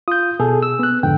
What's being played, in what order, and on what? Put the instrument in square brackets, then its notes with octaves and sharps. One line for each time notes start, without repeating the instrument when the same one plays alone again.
[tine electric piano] F4 [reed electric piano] D#6 G6
[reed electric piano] B2 [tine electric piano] G#4 A4
[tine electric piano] E6
[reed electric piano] B3 F#6
[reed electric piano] F2 G#2 G5 [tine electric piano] D3